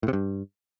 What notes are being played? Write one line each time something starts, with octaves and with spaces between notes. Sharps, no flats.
A2
C3
G2